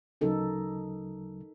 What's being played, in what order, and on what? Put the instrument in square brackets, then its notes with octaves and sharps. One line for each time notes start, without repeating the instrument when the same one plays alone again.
[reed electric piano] D2 C#3 F#3 [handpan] D#4 A4 A#4